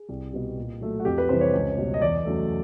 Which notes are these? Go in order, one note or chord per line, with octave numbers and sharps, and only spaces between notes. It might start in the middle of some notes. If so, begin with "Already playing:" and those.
Already playing: G#4
C2
B2 G3
A#2
F#3 A3
F#4
F2 G4
B4
C3 E3 G3 C5
C#5
C#2
B2 G3
D#5
E2 D5
C#3 F#3 A3